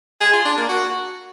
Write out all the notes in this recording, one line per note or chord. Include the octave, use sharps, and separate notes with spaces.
G#4
F4
D4
A#3
F#4